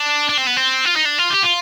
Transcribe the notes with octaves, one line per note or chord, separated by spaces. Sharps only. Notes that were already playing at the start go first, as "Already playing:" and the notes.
Already playing: D4
D4
C4
B3
C4
F4
D#4
D4
F4
G4
F4